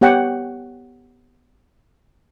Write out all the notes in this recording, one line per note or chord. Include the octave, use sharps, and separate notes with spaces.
B3 G4 C#5 F#5 G5